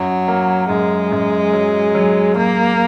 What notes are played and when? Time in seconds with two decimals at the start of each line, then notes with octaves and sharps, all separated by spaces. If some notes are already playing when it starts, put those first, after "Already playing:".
Already playing: F#2 F#3
0.28 A#3
0.69 F#2 G#3
1.12 F#2
1.54 F#3
1.95 F#3
2.36 F#3 A#3